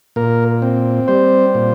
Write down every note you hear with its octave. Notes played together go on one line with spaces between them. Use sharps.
A#2 A#4
C4
G3 C5
A#2